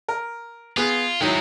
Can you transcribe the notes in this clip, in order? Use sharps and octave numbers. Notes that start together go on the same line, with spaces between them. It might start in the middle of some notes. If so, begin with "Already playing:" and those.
A#4
B3 F4 G#4
D#3 F#3 G#3 D#4 E4